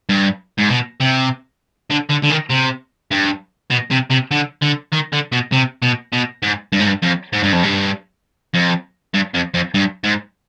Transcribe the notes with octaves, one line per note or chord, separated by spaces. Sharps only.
G2
G#2
B2
C3
D3
D3
D3
D#3
C3
G2
B2
C3
C3
D3
D3
D#3
D3
B2
C3
B2
B2
G#2
G2
G#2
G2
F2
G#2
G2
F2
G2
F2
G2
F2
F2
G2
G#2